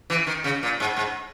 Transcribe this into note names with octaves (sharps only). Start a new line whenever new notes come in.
E3
D#3
C#3
A#2
G#2
G#2